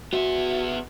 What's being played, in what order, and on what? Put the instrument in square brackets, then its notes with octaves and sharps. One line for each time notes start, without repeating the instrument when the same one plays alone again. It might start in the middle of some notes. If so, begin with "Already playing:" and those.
[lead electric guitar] B3 E5 [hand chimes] F#4